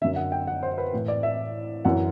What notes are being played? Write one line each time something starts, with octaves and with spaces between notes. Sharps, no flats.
F#2 D3 E5
F#5
G5
F#5
C5
B4
A2 E3
D5
E5
F#2 E3 F#5